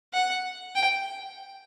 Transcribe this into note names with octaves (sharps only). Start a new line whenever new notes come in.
F#5
G5